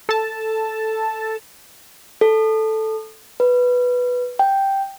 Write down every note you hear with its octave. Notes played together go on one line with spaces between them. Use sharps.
A4 A5
A4
B4
G5